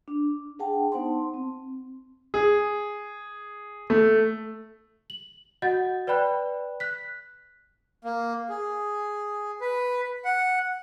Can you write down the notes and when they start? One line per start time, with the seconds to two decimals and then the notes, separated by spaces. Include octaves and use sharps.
0.08 D4
0.59 D4 G#4 F#5 G5 A5
0.92 B3 D#4 C5 F#5 A5 C6
1.34 C4
2.34 G#4
3.90 A3
5.10 F#7
5.62 F#4 D#5 F#5 G6 A6
6.07 B4 D5 G5 B5 F#6
6.80 F#6 B6
8.04 A#3
8.49 G#4
9.61 B4
10.25 F#5